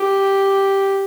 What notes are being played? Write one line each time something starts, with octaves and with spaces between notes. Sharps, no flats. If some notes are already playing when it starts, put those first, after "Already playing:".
Already playing: G4